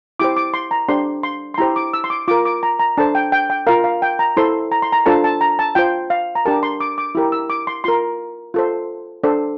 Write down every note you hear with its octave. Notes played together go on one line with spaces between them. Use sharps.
E4 G4 C5 D6
D6
C6
A#5
D4 G4 C5 C6
C6
C6
E4 G4 C5 A#5
D6
E6
C6
D6
F4 A#4 D6
D6
A#5
A#5
D4 A4 C5 A5
G5
G5
G5
F4 A#4 F5
F5
G5
A#5
E4 A4 C5 C6
A#5
C6
A#5
D4 F4 A4 C5 A5
A5
A#5
A5
F4 C5 G5
F5
A#5
D4 G4 A#4 A5
C6
D6
D6
E4 G4 A#4
E6
D6
C6
F4 A#4 C6
F4 A4 C5
D4 A4 C5